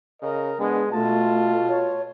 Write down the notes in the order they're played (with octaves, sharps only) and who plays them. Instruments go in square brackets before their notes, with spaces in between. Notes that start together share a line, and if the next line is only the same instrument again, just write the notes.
[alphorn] C#3 [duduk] A#4 [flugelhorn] D#5
[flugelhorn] G#3 [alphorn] B3 [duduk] D4
[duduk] B2 [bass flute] A3 [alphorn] F4 [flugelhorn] A5
[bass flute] C#5